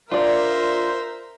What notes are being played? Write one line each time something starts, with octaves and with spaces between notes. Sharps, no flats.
D4 F4 A#4 C5 D5 E5 A#5